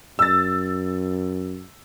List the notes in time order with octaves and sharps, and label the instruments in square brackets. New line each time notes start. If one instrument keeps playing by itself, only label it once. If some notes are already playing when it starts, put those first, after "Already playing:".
[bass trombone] F#2 [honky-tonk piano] E6 A6